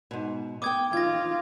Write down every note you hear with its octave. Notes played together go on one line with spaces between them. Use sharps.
G#2 B2
B3 G5 D6 D#6 G#6
D#2 F4 G#6 A#6